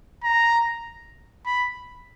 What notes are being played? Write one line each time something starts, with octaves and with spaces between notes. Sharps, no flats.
A#5
B5